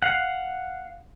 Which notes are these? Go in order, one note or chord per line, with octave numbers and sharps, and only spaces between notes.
F5 F#5